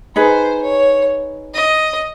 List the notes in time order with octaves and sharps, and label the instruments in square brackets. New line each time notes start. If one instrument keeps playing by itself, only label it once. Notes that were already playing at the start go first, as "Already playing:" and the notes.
[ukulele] D#4 G#4 B4 [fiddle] C5
[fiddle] C#5
D#5